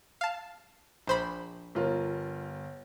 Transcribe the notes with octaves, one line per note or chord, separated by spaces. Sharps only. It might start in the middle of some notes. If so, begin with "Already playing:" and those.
F5 A5
A#1 C5 B5
G1 F4 A#4